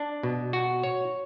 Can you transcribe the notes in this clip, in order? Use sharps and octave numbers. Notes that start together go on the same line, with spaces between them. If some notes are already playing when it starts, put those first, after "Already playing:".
Already playing: D4
B2
F#4
C#5